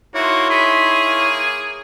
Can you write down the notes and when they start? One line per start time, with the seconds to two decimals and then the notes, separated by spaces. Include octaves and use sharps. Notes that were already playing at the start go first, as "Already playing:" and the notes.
0.14 A#3 D#4 E4 F#4 C#5 C6
0.50 G#4 B5
1.06 A#3